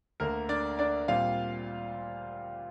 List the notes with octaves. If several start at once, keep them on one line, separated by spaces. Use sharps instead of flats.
D2 D3 A#3 A#4
D4 D5
D4 D5
A#2 G3 C4 F4 F5